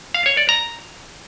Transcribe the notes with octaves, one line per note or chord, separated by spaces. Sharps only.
F5
C#5
D5
A#5